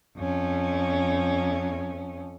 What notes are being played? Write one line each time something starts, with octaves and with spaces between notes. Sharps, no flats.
F2 C#4